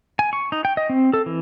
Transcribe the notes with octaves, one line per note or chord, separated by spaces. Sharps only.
G#5
C#6
D#4
G5
D#5
C4
A4
E3